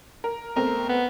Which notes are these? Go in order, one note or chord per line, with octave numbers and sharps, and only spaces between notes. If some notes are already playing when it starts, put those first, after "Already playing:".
A#4
B2 A3 C4 A#4
B3